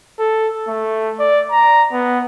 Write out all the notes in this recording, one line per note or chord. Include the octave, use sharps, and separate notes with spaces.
A4
A3
D5
A#5
B3